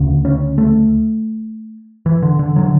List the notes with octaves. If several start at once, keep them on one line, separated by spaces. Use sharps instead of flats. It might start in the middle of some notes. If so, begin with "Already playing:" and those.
Already playing: D2 C#3
C#4
A3
E3
D3
D3
D3 F#3